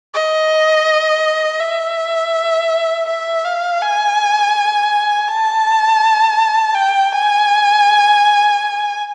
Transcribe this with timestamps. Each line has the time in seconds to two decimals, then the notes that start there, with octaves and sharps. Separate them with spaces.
0.14 D#5
1.60 E5
3.08 E5
3.45 F5
3.82 G#5
5.28 A5
6.75 G5
7.12 G#5